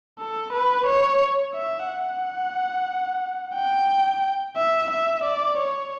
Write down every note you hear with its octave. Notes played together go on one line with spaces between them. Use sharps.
A4
B4
C#5
E5
F#5
G5
E5
E5
D5
C#5